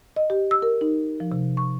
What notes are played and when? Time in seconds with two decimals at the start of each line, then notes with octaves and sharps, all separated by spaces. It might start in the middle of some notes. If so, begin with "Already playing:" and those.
0.16 D#5
0.30 G4
0.51 E6
0.62 A#4
0.81 D#4
1.20 F3
1.32 C3
1.57 C#6